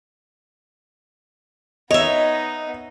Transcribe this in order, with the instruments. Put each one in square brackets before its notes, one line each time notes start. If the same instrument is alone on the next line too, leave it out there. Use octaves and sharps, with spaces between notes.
[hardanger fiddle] B3 D#4 [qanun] C#5 E5 [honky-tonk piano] D#5